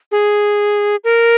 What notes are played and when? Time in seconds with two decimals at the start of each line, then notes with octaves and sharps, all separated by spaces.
0.12 G#4
1.04 A#4